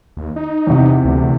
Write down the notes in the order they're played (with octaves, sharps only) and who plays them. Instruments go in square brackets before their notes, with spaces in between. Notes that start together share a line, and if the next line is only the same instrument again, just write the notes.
[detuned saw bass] D#2
D#4
[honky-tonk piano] E2 C3
[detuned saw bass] D2